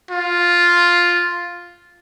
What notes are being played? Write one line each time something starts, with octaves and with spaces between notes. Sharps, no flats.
F4